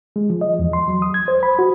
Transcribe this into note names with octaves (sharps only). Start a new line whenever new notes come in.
G#3
F3
D#5
E2
C6
F#3
D#6
G#6
C5
B5
F#4